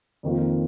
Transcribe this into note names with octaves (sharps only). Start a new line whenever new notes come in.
F2 D#3 A#3 F4